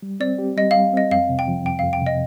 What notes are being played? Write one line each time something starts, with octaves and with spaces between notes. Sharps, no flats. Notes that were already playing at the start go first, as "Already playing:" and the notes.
G3
C4 D5
G4
G3 D#5
G3 F5
C4 D#5
F2 F5
C3
G5
F3
F2 G5
F2 F5
G5
C3 D#5